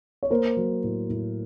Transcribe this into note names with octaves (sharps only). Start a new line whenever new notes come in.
C#5
A#3 A#4 C5
F#3
A2
A2